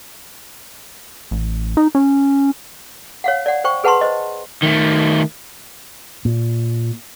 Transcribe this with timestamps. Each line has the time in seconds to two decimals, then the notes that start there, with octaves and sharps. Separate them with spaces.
1.31 A1
1.77 D#4
1.95 C#4
3.24 C#5 F5 F#5
3.46 D5 F#5
3.64 C5 G5 C#6
3.84 G#4 B4 F#5 A5 B5 C6
4.01 C5 D#5
4.63 D#3 A3
6.25 A#2